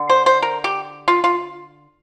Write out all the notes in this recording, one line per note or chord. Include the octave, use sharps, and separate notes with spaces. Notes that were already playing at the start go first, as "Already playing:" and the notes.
Already playing: D3
C5
C5
A#4
G4
F4
F4